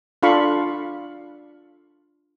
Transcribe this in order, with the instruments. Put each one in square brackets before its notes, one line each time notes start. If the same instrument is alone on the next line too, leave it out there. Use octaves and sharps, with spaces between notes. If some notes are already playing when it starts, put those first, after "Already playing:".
[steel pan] D4 F4 A4 F5 B5 C#6